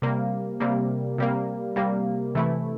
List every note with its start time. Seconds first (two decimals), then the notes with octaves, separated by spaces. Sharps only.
0.02 C3 G3 A#3
0.60 C3 G3 A#3
1.18 C3 G3 A#3
1.76 C3 G3 A#3
2.35 C3 E3 A3 E4